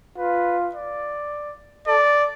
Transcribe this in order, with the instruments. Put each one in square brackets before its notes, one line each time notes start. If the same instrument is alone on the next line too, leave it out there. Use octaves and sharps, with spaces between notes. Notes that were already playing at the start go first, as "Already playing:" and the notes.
[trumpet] F4 [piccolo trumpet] B4
[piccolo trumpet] D5
[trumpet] A4 [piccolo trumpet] D5